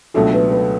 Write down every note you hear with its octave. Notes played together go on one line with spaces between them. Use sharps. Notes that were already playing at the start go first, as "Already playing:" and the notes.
C#2 B2 F#3 A3 D4 A4
B4
B4